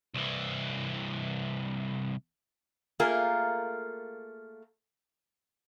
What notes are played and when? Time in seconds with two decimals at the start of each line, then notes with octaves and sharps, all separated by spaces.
0.14 C2 E3
3.00 A3 A#3 F4 G#4 A#4